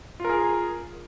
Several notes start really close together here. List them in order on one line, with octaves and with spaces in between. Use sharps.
F4 A#4 G#4